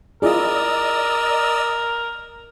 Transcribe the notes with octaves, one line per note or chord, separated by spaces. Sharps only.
E4 F4 G#4 A#4 D5 D#5 E6